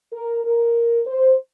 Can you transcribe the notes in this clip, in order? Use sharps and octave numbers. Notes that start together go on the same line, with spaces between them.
A#4
A#4
C5